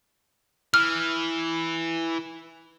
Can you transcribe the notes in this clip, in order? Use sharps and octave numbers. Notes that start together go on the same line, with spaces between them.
E3 F6